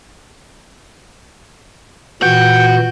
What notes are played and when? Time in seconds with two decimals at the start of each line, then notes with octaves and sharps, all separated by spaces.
2.22 A#2 E3 F#4 G5